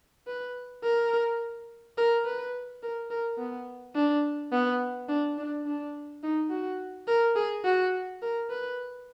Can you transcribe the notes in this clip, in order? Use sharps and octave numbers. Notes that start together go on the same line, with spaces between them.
B4
A#4
A#4
B4
A#4
A#4
B3
D4
B3
D4
D4
D4
D#4
F#4
A#4
G#4
F#4
A#4
B4